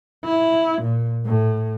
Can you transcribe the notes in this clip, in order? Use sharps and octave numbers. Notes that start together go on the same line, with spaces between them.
E4
A#2
A2